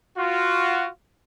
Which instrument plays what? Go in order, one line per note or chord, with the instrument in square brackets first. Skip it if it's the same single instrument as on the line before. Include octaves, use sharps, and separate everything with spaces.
[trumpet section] F4 F#4